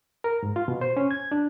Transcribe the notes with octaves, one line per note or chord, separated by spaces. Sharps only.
A#4
G#2
F4
B2
C5
C#4
G#6
D4